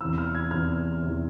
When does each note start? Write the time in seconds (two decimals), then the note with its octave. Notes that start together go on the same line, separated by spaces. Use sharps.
0.01 E2 C3 E3 E6
0.18 F6
0.35 G#6
0.51 E2 C3 E3 F6
1.02 E2 C3 E3